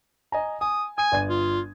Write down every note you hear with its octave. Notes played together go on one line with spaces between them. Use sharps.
D#5 G#5 A#5
G#5 D#6
G#5 D#6 D#7
G1 D5 G#6
F4